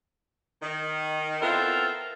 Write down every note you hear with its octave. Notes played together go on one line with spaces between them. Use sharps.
D#3
B3 C4 E4 F4 A4 A#4